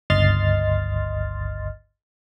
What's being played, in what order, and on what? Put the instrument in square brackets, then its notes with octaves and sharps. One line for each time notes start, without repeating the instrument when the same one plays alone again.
[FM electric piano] G1 C#2 D#5 C6 F6 A6